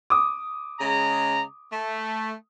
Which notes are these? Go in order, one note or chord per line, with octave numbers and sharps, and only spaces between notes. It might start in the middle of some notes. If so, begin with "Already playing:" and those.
D6 D#6
C#3 G#3 A#5
A3